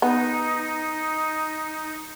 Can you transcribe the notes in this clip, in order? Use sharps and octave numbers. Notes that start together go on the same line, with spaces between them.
B3 D#4